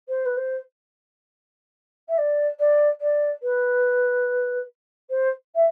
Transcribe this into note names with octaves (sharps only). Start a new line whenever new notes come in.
C5
B4
C5
E5
D5
D5
D5
B4
C5
E5